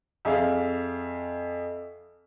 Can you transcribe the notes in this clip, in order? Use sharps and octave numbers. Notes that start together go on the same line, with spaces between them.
F2 G#4 E5 F5